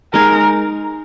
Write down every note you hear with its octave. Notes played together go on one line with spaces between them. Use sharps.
G#3 D#4 G#4 A#4